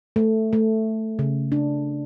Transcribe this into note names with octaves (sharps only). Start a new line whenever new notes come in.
A3
A3
C#3
D4